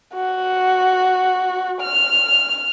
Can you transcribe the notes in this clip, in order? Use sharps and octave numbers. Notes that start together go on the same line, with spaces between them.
F#4
F6